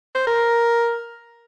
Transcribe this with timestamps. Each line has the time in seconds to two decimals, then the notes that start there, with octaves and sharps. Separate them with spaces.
0.15 C5
0.27 A#4